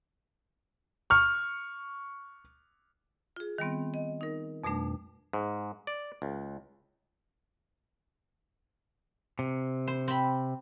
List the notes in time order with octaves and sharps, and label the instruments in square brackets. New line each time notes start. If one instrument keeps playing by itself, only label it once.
[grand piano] C#6 F6
[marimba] F4 G#4
D#3 G3 B3 C4
D#5
D#4 A#4
F2 B2 G3 A3 D4
[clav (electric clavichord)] G#2
D5
C#2
[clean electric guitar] C3
[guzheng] C5
C4 B5